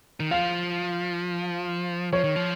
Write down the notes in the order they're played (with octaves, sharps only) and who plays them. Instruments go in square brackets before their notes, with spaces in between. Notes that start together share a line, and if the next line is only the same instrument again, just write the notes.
[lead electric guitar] D#3
[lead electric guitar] F3 [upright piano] F5
[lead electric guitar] F3 [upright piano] C#5
[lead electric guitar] D#3
F3